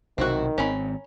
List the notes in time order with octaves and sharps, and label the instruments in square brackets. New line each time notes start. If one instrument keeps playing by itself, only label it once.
[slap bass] B1 C3 [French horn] D#3 [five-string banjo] C4 E4 F#4
[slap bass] G#1 C4 [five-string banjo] C#4 A#4 B5